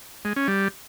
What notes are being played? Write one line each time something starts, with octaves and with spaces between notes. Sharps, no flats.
G#3
C#4
G3